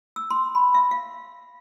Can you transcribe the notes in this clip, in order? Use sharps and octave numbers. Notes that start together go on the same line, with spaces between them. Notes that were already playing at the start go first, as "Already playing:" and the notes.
E6
C6
B5
E5
F5